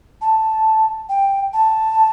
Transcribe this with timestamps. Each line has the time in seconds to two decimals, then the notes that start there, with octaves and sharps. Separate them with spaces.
0.22 A5
1.09 G5
1.53 A5